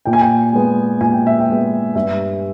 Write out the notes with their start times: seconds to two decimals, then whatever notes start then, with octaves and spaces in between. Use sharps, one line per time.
0.05 A#2 G5
0.13 G#5
0.21 G5
0.53 G#3 B3
1.01 A#2 G#5
1.13 G5
1.27 E5
1.40 G5
1.48 G#3 B3
1.95 G2 E5